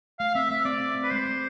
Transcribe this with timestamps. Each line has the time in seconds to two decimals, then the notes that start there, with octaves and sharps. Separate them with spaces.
0.19 A3 F5
0.35 C4 E5
0.50 A3 E5
0.65 C4 D5
0.80 C4
0.95 C4
1.03 B4
1.11 G#3 C5
1.26 G#3